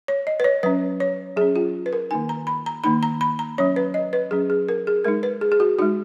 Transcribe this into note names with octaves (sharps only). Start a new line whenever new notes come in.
C#5
D#5
B4
C#5
F#3 C#4 B4
C#5
F#3 C#4 G#4
F4
B4
A#4
D#3 A#3 D#4 G#5
A#5
B5
A#5
D#3 A#3 D#4 B5
A#5
B5
A#5
F#3 C#4 C#5
B4
D#5
B4
F#3 C#4 G#4
G#4
A#4
G#4
G#3 D#4 A#4
B4
G#4
G#4
F#4
G#3 D#4 F#4